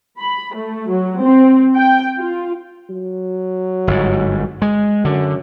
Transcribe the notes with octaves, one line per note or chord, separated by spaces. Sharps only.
B5
A3
F#3
C4
G5
F4
F#3
G1 G#2
G#3
F#2 D3